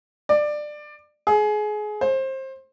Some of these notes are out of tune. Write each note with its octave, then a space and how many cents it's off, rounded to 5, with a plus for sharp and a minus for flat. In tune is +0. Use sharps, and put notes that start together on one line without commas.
D5 +20
G#4 +25
C5 +25